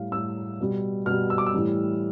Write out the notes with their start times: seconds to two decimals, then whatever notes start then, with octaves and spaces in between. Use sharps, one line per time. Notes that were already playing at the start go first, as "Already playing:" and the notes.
Already playing: A2 G3 F5
0.12 A2 G3 E6
0.60 B2 G3
1.06 B2 G3 F6
1.30 E6
1.38 D6
1.46 E6
1.54 A2 E3 G3